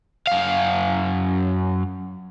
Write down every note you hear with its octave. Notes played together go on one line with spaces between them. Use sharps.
F#2 F5